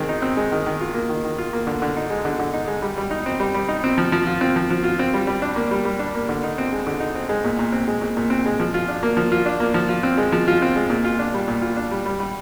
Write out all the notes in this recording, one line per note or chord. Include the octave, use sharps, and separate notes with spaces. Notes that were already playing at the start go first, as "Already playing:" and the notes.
Already playing: D#3 G#3 C4
D#4
C4
G#3
D#3
D#3
F4
A#3
D#3
D#3
F4
A#3
D3
D3
D#4
G#3
D3
D3
D#4
G#3
G3
G3
D#4
C4
G3
G3
D#4
C4
F3
F3
F4
C4
F3
F3
F4
C4
G3
G3
D4
A#3
G3
G3
D4
A#3
D3
D#4
C4
G#3
D3
D#4
C4
G#3
A#2
A#2
C4
G#3
A#2
A#2
C4
G#3
F3
F4
D4
A#3
F3
F4
D4
A#3
F3
F4
C4
G#3
F3
F4
C4
G#3
A#2
F4
D4
G3
A#2
F4
D4
G3
G3
G3